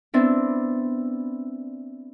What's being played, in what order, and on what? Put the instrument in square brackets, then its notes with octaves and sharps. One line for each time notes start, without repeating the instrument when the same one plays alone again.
[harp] B3 C4 D4 E4